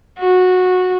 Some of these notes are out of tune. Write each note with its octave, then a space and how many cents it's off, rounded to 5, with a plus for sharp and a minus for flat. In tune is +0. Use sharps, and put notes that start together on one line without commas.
F#4 -15